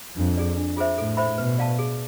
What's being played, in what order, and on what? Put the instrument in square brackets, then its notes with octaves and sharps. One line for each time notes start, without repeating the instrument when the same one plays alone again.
[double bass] F2 [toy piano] D4
[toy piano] G#4 D5
D4
F4 G#4 C5 E5
[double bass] A2 [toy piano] A4
[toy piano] C5 E5 B5
[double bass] B2 [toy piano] B4
[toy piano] D5 F5 A5
G#4